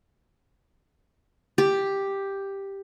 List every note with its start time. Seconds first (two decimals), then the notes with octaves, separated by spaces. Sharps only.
1.58 G4